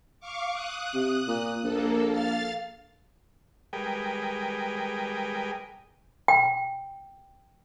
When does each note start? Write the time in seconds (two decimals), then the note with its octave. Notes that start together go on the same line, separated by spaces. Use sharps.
0.20 F5 C#6 D6
0.52 D#6 F#6
0.94 C3
1.28 A#2
1.64 A#1 A#3 A4
2.12 F5 F6 A6
3.73 G3 G#3 G#4 A#4 B4 G5
6.28 G5